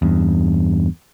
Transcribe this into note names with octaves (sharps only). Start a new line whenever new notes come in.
E2 G2